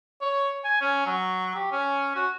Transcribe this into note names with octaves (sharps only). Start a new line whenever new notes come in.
C#5
G#5
C#4
F#3
G4
C#4
F#4